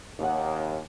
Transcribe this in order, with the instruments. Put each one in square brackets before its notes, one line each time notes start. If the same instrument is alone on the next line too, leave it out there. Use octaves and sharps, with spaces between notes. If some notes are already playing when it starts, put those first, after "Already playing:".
[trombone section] D#2 [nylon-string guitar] C#5 F#5